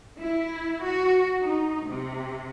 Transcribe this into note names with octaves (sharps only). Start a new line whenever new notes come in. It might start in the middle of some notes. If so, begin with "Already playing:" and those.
E4
F#4
D#4
C3